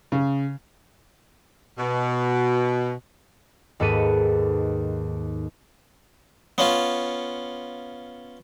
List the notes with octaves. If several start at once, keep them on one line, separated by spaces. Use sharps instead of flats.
C#3
B2
D#2 G#2 A4 B4 C#7 D#7
B3 C#4 F4